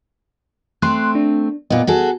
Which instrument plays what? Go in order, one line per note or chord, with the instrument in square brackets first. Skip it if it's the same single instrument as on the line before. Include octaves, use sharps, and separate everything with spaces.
[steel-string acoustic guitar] A3 C4 [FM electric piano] C6 F#6
[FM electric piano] D4
[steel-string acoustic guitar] A#2 B3 [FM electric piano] D#5
[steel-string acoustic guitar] F#4 G#4 A4